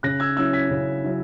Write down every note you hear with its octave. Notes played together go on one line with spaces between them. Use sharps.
C#3 F#6 A#6
E6 G#6
F#3 C#4 E4 E6 G#6
G#6 B6
C#3
F#3 C#4 E4